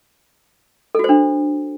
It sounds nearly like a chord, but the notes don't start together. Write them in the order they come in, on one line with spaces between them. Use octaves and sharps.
A4 F#4 C5 D4